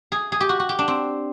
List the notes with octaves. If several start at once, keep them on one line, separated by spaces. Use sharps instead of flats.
G#4
G#4
G4
F#4
F#4
G4
D4
C4